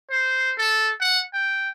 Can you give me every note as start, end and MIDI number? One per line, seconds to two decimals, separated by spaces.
0.10 0.51 72
0.58 0.91 69
1.01 1.21 78
1.33 1.69 79